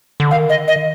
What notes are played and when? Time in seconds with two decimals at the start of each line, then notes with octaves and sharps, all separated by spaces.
0.20 D3
0.31 D#3 F5
0.49 D#5
0.68 D#5